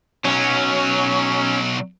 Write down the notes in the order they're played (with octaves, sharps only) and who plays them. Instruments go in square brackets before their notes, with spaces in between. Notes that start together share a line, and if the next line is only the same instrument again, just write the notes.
[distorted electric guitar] B1 F#3 [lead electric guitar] C#4